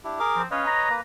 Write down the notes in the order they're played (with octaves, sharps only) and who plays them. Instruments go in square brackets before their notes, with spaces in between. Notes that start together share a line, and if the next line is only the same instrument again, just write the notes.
[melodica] D4 E4 G4
G#4 A#4 D6
[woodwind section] F3 C4
[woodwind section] C#4 F5 [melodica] B4 C#5 D#5
[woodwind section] A#5
[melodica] A#3 B4